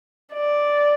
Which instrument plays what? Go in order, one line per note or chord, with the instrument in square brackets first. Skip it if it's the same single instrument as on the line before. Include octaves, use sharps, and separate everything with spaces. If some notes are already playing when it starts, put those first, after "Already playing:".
[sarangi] D5